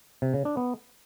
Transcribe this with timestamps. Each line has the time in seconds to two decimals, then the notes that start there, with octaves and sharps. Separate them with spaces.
0.22 C3
0.34 C#3
0.45 D4
0.57 B3